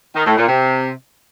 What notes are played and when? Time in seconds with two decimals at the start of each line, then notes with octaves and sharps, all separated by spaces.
0.15 D#3
0.26 A2
0.37 A#2
0.48 C3